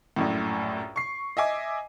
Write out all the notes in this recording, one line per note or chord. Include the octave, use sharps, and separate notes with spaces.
A#1 F#2 A2
C#6 C7
D#5 E5 G#5 D6